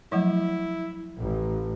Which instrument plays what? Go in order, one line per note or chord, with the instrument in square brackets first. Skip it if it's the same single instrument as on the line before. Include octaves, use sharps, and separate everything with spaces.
[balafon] F3 F#3 A3 [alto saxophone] E4
[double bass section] A1